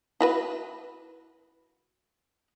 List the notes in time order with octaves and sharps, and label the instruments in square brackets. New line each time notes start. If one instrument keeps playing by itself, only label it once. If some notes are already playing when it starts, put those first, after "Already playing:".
[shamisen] E4 F#4 B4